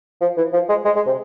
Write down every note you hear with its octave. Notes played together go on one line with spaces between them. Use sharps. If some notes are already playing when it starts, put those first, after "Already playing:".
F3
E3
F3
G#3
G#3
G#3
C3